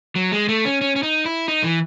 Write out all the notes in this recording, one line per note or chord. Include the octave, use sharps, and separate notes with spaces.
F#3
G#3
A3
C#4
C#4
C#4
D#4
E4
D#4
E3